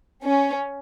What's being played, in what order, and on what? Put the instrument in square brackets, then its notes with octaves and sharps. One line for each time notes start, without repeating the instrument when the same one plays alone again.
[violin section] C#4